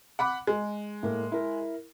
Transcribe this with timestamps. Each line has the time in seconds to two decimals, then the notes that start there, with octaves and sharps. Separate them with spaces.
0.19 F#5 B5 D6
0.47 G#3
1.03 A2 A#3
1.32 E4 A#4